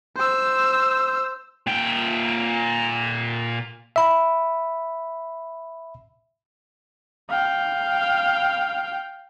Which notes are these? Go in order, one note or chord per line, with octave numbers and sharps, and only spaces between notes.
C5 E6
A#2 G5
E5 B5
F5 G5